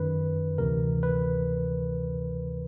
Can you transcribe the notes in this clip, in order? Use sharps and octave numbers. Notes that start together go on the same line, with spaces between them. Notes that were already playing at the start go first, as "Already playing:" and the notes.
Already playing: F#2 D#3 B4
D2 C3 E3 A#4
B4